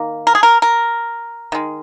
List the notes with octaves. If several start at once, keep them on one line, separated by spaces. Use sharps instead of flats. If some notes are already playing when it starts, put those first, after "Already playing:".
Already playing: D#3 A#3
A#4
G#4
A#4
A#4
D#3 G#3